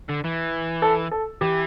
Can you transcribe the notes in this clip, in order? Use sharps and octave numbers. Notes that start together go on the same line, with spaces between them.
D3
E3
A4
A4
E3 G4